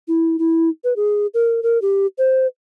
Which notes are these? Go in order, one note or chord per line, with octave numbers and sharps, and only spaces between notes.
E4
E4
B4
G#4
A#4
A#4
G4
C5